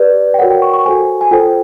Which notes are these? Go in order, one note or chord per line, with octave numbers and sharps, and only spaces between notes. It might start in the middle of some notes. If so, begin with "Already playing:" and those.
Already playing: G4 B4 D5
G5
F#4 A#4 C#5 F#5
G5
C#6
C#6
F#4 A4 C5 G#5
G#5
F4 A4 C5 G5